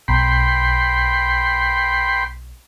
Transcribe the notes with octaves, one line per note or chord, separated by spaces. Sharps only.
B1 G5 B5 C6